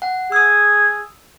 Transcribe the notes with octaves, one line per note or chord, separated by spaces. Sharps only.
F#5
G#4 D#6 E6